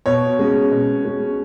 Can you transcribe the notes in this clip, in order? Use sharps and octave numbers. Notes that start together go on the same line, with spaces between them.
B2 C#5
G#3 C#4
B2
G#3 C#4